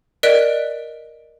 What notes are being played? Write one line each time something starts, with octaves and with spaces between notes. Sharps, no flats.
A#4 D5 D#5 F#6 B6 D7